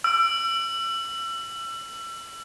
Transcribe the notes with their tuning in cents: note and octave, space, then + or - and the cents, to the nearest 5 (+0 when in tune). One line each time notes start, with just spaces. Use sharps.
E6 +35